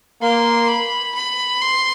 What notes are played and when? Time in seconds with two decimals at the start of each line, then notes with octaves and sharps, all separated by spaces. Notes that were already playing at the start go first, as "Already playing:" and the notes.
0.22 A#3 C6
0.68 B5
1.15 B5
1.62 C6